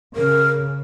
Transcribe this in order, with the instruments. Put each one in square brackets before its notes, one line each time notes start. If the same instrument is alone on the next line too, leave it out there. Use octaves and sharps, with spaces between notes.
[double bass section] C#3 [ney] A#4